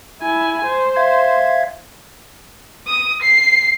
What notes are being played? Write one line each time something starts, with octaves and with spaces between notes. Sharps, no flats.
E4 G#5
C5
E5 F5 G#6
D#6
C7